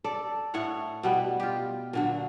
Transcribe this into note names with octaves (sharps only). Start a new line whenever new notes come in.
A4 D5
A2 A3 C#5 F#5
B2 G3 B3
F4 G4
A#2 D3 F#3